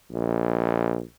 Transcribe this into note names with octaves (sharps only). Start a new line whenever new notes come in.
A#1